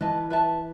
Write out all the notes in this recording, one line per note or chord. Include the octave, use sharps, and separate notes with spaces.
E3 B4 D#5 A5
B4 E5 A5